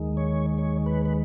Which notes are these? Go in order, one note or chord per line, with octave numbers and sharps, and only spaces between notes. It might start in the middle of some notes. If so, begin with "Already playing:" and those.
Already playing: D#2 D#3 G#3
C#5
C#5
B4
B4